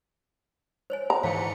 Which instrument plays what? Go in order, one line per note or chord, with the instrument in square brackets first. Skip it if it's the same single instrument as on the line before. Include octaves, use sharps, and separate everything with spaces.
[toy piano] C5 C#5 G#5
[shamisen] A#5
[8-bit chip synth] G#2 E3 C#7 [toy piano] F5